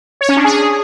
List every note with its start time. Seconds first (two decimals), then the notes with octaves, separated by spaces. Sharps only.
0.21 C#5
0.29 C#4
0.37 D4
0.44 G#4